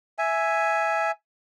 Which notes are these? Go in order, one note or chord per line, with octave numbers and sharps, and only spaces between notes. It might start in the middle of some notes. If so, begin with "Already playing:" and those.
E5 G#5